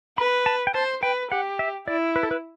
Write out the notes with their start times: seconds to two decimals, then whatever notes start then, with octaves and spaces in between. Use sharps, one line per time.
0.18 B4 B5
0.46 A5
0.67 G5
0.74 C5 A5
1.03 B4 G5
1.31 G4 F#5
1.59 E5
1.87 E4 D5
2.16 B4
2.23 A4
2.31 B4